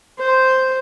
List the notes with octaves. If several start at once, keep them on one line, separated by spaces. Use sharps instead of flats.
C5